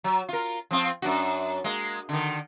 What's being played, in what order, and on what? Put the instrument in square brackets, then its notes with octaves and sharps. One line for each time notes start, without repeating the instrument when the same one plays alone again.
[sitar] F#3
F4 A#4
F3 C4 F4
F#2 D4 F#4
G#3 A#3
D3 D#3